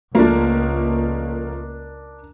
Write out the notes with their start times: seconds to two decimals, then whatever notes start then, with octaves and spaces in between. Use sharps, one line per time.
0.15 C#2 F3 A3 A#3 D4 A#4